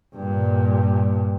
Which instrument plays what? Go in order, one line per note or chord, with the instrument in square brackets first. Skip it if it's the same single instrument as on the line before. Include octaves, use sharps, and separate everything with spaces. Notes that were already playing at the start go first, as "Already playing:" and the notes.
[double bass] G2 A#2